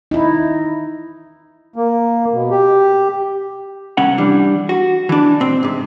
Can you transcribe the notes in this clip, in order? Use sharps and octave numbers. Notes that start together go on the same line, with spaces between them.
D#4 E4
A#3
B2
G4
C2 C#4 F#5
E3 G3 D4
F#4
E3 D4
B2 C4
G#2 C3